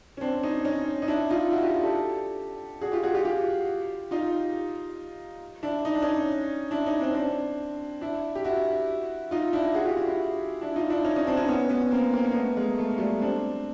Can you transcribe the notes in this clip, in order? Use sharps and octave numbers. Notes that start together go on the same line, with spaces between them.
C#4
C4 D4
C#4 D#4
C#4 D#4
D#4
D4 E4
D#4 F4
E4 F#4
F4 G4
G4 A4
F#4 G#4
F4 G4
F#4 G#4
F4 G4
F4 G4
D#4 F4
D4 E4
D#4
D4
C#4 D#4
D4 E4
C#4 D#4
C4 D4
C4 D4
D4 E4
G4
E4 F#4
D#4 F4
D4 E4
F#4 G#4
F4 G4
E4 F#4
E4 F#4
D4 E4
D#4 F4
D4 E4
C#4 D#4
C#4 D#4
C4 D4
C#4 D#4
B3 C#4
B3 C#4
A#3 C4
A#3 C4
A#3
A3 B3
G#3 A#3
A3
A#3
G3 A3
C4 D4